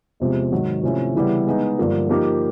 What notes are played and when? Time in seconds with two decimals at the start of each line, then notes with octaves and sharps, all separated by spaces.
0.20 E2 C3 F3 G#3
0.52 G#2 D#3 F#3
0.83 C3 F3 A3 C#4 E4
1.14 C#3 E3 G3 B3 E4
1.47 G#3 B3 D#4
1.79 G2 D3 F3 A#3
2.09 F3 A#3 D#4 G4